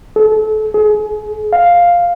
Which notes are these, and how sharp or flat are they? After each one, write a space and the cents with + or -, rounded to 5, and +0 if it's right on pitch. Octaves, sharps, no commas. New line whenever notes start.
A4 -30
G#4 +35
F5 +0